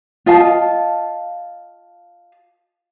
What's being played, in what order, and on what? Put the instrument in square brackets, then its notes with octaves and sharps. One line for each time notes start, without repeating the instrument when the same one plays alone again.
[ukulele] F4 D#5 F5 A5